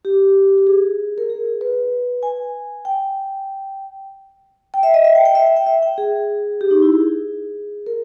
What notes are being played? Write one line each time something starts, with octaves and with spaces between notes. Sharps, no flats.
G4
G4
G#4
A#4
G#4
B4
G#5
G5
G5
E5
D#5
E5
G5
G5
E5
G5
G5
E5
G5
G#4
G4
D#4
E4
G#4
A#4